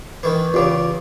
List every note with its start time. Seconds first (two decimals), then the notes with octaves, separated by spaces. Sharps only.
0.23 D#3 E3
0.54 E2 C#3 F4 G4 D6